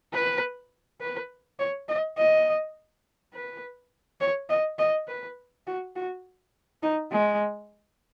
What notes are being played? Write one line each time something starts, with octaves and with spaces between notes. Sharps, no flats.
B4
B4
C#5
D#5
D#5
B4
C#5
D#5
D#5
B4
F#4
F#4
D#4
G#3